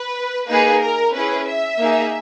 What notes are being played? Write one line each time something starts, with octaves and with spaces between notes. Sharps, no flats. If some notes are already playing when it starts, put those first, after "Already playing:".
Already playing: B4
A#3 D#4 G#4 B4
A#4
C#4 E4 G#4 B4
E5
A#3 D#4 G#4